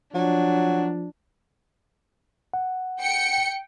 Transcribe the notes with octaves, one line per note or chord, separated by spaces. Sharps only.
F3 F#3 D4
F#5
G5 C#7